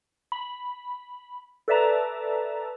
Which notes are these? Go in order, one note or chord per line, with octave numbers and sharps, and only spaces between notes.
B5
A4 B4 D5 E5 A5 A#5